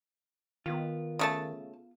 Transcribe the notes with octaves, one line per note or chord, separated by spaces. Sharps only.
D#3 B3 F4
C#3 A3 A5